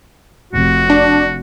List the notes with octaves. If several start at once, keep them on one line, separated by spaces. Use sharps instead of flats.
F1 F#4
D4